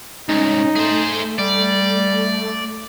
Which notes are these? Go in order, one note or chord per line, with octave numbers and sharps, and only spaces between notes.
C2 G#2 C#4 D#4
A3 G#4 C5
G3 D5